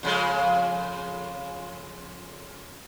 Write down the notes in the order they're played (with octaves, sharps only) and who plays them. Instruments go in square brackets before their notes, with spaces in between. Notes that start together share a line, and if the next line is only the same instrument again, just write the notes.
[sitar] F2 C#3 G#3